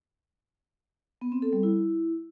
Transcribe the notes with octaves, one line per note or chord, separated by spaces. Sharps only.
B3
C4
A4
G3
E4